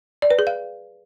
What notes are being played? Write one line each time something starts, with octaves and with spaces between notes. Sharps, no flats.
D5
B4
G#4
F5